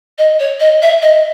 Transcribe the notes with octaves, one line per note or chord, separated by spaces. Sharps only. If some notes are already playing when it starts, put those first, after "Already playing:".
D#5
C#5
D#5
E5
D#5